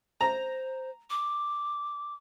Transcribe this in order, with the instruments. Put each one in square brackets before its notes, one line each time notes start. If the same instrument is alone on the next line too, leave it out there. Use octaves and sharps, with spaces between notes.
[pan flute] C5 [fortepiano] A#5
[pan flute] D6